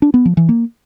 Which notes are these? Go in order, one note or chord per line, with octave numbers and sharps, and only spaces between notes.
D4
B3
F3
E3
A#3